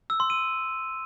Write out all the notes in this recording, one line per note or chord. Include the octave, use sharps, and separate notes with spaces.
E6
C6
D#7